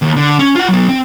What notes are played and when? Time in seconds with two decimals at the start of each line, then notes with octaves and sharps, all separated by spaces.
0.02 D#2
0.16 D3
0.39 C#4
0.56 F4 F#5
0.69 F#3 B3
0.89 C4